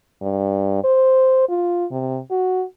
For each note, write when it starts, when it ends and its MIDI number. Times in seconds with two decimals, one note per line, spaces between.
0.22 0.82 43
0.84 1.47 72
1.49 1.85 65
1.91 2.20 48
2.31 2.64 66